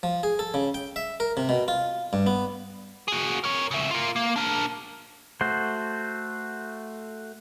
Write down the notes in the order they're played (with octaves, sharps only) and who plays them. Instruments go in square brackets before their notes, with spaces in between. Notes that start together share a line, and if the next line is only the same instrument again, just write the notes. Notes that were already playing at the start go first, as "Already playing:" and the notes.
[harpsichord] F3
G#4
A4
C#3
G5
E5
A#4
C3
B2
F4
G2
B3
[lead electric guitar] F#4 G#4
A#4 C#5
C#3 E5
F4 A#4
A#3
D4 A#4
[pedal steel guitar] A3 F#4 C5